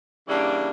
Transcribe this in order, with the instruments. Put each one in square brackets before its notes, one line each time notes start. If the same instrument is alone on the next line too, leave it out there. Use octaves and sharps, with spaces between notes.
[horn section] C#3 E3 G3 A#3 D4